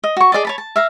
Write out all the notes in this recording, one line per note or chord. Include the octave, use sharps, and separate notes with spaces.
D#5
F#4 C#6
G#4 D5 D#5 A5
C#5 A5 B5
A5
E5 F5 A#5